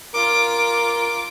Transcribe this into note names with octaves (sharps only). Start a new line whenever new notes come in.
F4 A#4 D6